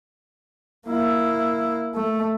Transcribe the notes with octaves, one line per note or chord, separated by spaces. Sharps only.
A#3 E4
A3